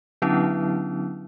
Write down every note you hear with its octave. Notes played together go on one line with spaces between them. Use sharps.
D3 F#3 B3 C#4 D4 E4